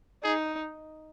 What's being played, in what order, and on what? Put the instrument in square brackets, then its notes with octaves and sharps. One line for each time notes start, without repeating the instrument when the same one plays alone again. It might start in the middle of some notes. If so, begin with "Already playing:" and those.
[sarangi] D#4 [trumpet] G#4